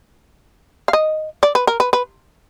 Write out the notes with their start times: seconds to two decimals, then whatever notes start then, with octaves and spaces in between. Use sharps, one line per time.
0.88 F5
0.93 D#5
1.43 D5
1.55 B4
1.67 A#4
1.80 B4
1.93 B4